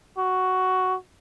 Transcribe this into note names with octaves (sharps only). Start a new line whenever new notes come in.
F#4